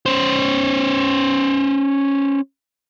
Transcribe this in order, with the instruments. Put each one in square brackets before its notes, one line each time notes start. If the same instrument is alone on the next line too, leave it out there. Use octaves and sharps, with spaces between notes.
[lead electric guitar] C#4 C5